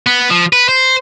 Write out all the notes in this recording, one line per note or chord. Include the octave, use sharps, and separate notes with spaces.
B3
F3
B4
C5